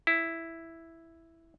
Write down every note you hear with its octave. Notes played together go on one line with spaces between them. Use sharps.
E4